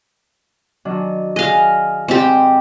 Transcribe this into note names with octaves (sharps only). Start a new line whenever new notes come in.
D#3 F#3 D4
G#4 D#5 F5 F#6
G#2 C4 G4 B4 C5